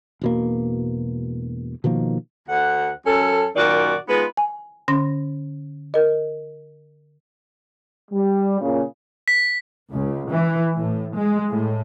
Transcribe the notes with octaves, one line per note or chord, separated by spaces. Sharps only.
E1 B2 A#3
B2 D#3 F3 A#3
D2 F#5
F#2 C#4 A4
F#2 A#2 D#3 F#4 D5
G#3 B3 D#4 F4 B4
G#5
D3 C#4 C6 A#6
A#4 D#5
G3
A#2 C#3
B6
C#2
E3
A2
G#3
A2